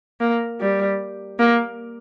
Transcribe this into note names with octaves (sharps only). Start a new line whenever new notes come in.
A#3
G3
A#3